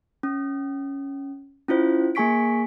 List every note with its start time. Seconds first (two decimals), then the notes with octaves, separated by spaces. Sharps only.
0.23 C#4
1.68 C#4 E4 F4 C5
2.15 A#3 G#4 G#5 C#6 B6 D7